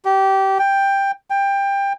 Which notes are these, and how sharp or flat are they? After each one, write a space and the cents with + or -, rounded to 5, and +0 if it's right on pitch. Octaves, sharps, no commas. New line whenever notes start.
G4 -20
G5 +10
G5 +20